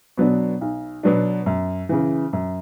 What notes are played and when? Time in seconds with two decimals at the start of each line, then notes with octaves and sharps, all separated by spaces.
0.18 B2 F#3 B3 D4
0.61 B1
1.03 B2 F#3 B3 D4
1.46 F#2
1.89 C#3 E3
2.33 F#2